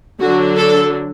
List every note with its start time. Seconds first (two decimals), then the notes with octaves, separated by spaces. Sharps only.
0.20 D3 F#3 D4 F#4
0.57 A4